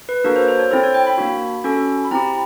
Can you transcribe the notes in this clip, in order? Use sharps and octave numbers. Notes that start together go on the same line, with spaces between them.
B4
A#3 D4 F#4 A4 A#4
C5
C5
C#5
C4 E4 A4 C5
C#5
G5
B5
A#3 D4 F#4
C#4 F#4 A4
B5
C4 E4 G4 A#5